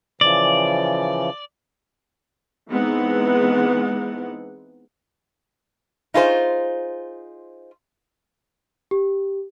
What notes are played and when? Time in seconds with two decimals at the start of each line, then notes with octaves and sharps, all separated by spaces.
0.21 C#3 E3 F3 D5
2.69 E3 G#3 B3 C4 D#4 F#5
6.14 D#4 F4 G#4 C5
8.91 G4